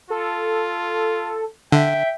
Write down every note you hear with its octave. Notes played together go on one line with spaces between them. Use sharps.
F4 A4
D3 E5 G5